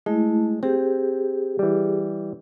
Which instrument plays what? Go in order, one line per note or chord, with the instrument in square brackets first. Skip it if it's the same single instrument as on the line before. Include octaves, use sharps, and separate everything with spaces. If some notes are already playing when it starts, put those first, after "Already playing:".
[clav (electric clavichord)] G#3 [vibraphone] A3 E4
[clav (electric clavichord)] C4 [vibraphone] G4 G#4
[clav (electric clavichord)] E3 G3